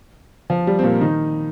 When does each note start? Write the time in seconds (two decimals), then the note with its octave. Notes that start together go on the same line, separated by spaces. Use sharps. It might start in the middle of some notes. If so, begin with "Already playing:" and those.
0.50 F3
0.67 G3
0.79 C4
0.83 A#2 A#3
1.01 D#3 D#4